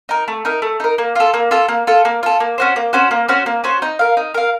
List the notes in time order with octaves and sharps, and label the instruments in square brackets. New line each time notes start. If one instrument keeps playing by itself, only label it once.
[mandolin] D#4 A#4
A3
D#4 A#4
A3
D#4 A#4
A#3
F4 A4
A#3
F4 A4
A#3
F4 A4
A#3
F4 A4
A#3
C#4 F#4 C5
A#3
C#4 F#4 C5
A#3
C#4 F#4 C5
A#3
C#4 F#4 C5
D#4
A#4 F5
D#4
A#4 F5